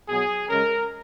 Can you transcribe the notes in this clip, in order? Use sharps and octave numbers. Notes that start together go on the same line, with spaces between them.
B2 F#3 B3 G#4
C#3 G#3 C#4 A#4